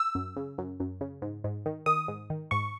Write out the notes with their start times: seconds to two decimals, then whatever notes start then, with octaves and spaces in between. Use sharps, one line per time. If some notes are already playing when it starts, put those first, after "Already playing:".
Already playing: E6
0.15 F#2
0.37 C#3
0.58 F#2
0.80 F#2
1.01 C#3
1.22 G#2
1.44 G#2
1.66 D#3
1.86 D#3 D#6
2.08 G#2
2.30 D#3
2.51 G#2 C#6